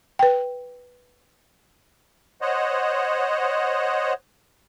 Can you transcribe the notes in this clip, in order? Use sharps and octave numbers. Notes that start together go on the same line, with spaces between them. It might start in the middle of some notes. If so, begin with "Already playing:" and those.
B4 G5
C5 C#5 D#5 F#5